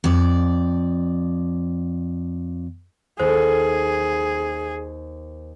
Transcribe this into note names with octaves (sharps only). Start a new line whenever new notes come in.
F2 D5
D#2 G#4 A4 C5